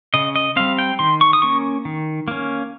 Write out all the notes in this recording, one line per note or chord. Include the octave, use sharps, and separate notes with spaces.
C#3 D#5
D#5
G3 C4 F5
G5
D#3 C6
C#6
D#6
A#3 C#4 C#6
D#3
A#3 C#4